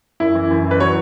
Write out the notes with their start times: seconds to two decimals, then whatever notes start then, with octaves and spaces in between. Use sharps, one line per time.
0.20 F#2 E4
0.35 E3
0.51 F#2
0.65 E3
0.71 B4
0.80 F#3 C#5